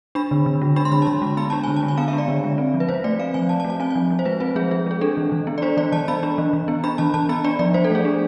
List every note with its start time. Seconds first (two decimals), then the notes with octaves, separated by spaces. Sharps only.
0.15 D4 B5
0.31 D3
0.46 D3
0.62 G#3
0.76 D4 B5
0.85 C6
0.92 D3 B5
1.02 A5
1.07 D3 B5
1.22 G#3
1.37 B3 B5
1.50 D4 A5
1.64 D3 G#5
1.76 A5
1.83 G#3
1.88 G#5
1.98 B3 F5
2.08 E5
2.13 D4
2.18 D5
2.28 D3
2.44 G#3
2.58 C4
2.74 F3
2.80 B4
2.89 F3 C5
3.04 A3 D5
3.19 C4 F5
3.34 F3 G#5
3.49 F3 A5
3.60 A5
3.65 A3
3.70 A5
3.80 C4 G#5
3.90 G#5
3.95 F3
4.10 F3
4.19 C5
4.25 G#3 B4
4.40 C4 B4
4.56 F3 G#4
4.71 F3 G#4
4.86 G#3 G#4
5.01 D4 A4
5.17 E3
5.32 E3
5.47 B3
5.58 D5
5.62 D4 C5
5.77 E3 D5
5.92 E3 A5
6.08 B3 B5
6.23 D4
6.38 E3
6.53 E3
6.68 B3
6.84 D4 B5
6.98 E3 A5
7.14 E3 A5
7.29 B3 B5
7.44 D4 D5
7.59 F3 D5
7.74 F3 C5
7.84 A4
7.90 A3 G#4
8.05 D4